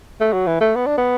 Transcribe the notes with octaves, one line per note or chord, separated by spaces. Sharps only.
A3
F#3
E3
A3
B3
D4
B3